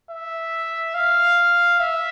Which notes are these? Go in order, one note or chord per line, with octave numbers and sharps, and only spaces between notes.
E5
F5
E5